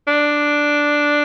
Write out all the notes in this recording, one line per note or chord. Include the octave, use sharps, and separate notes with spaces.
D4